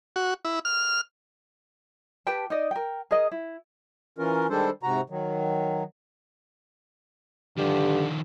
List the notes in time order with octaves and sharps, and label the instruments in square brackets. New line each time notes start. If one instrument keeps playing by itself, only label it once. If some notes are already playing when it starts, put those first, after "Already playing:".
[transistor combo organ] F#4
E4
F6
[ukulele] G4 B4 G5 A5
D#4 D5 D#5
A#4 G5
G#4 A#4 D#5
E4
[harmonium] E3 C#4 F4 A#4
D#3 G3 G#3 D4 A4 C5
G#2 C3 F#4 A#5
D#3 F#3
[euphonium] G2 [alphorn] D3 [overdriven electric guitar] D#3 F3 [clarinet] G4